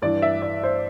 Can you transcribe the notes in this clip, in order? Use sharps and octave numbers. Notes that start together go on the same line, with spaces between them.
G2 E3 D5
E5
D5
C5